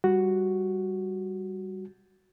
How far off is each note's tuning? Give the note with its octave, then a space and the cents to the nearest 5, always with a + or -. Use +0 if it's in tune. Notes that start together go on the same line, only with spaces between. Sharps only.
G3 +0 F#4 +0